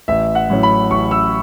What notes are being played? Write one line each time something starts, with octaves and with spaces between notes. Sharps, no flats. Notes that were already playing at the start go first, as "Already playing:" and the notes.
A1 E5
F#5
A2 F#3 C#4
B5
A1 C#6
E6